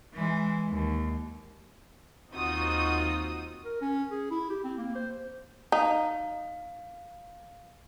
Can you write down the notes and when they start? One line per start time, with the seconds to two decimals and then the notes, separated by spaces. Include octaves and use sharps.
0.14 E3 G#3
0.69 D#2
2.32 D#2 C4 D#4 F4 F#4 D#6
3.65 A#4
3.81 C#4
4.11 G#4
4.31 E4
4.50 G4
4.64 C4
4.78 A#3
4.95 C5
5.72 D#4 F5